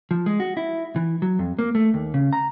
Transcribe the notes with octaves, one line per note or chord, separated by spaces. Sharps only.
F3
G#3
F#4
E4
E3
F#3
F2
A#3
A3
D#2
C#3
A#5